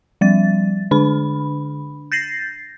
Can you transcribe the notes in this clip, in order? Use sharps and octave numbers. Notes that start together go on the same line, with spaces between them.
F3 G3 A6
D3 D4 B5
G6 A6 A#6 C7